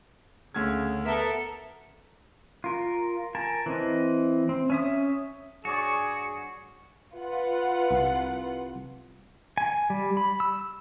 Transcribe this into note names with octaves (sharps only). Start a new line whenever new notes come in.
D2 C#3 G#6
B3 A4 A#4 E5
F4 A#4
A#4 G#5 A5
E3 C4 D#5
C4
C#4 E5 D#6
G2 F#4 G#4 C#5 D5
F4 B4 F#5
C2
G#5
G3
B5
E6